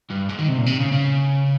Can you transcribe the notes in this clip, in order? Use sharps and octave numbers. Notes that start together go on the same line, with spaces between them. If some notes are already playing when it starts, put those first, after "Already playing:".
G2
G#2
D#3
C3
A#2
C3
C#3
C#3